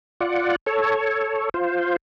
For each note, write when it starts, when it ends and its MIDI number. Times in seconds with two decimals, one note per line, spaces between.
0.21 0.56 65
0.21 0.56 74
0.21 0.56 78
0.66 1.49 69
0.66 1.49 73
1.54 1.96 65
1.54 1.96 72